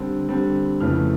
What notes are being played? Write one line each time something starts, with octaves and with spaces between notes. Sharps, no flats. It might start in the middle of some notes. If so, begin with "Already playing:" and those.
Already playing: D3 G3 C4
D3 G3 C4
F2 C#3 E3 A3 F6